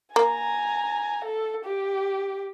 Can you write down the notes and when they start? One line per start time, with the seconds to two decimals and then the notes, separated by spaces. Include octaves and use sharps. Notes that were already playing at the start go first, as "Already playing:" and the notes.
0.16 A#3 G#5 A#5
1.25 A4
1.65 G4